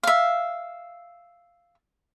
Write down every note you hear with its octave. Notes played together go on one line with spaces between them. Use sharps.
E5 F5